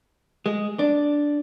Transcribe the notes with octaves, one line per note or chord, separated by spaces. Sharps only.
G#3
D4